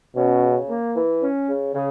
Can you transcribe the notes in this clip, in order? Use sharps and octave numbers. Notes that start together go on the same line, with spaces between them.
B2 C#4
C#3
A#3
E3
C#4
C#3
C#3